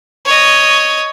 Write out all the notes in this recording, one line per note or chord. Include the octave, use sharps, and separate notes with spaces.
C#5 D#5